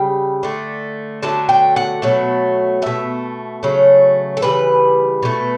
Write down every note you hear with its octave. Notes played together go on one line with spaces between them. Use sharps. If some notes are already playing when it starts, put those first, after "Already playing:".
Already playing: C#3 G3 G5
D3 A3
D3 F#3 A3 A5
G5
F#5
B2 F#3 A3
B2 A3 E5
C#3 F#3 A3
A4
C#3 E3 G3 B4
B2 A3